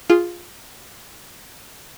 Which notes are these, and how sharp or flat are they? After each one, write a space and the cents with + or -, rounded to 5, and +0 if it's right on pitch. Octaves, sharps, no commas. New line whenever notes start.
F4 +0 G#4 -5